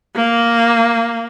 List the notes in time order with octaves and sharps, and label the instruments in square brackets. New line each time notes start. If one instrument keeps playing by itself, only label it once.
[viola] A#3